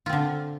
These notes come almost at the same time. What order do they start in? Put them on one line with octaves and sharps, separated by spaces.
F4 C4 D3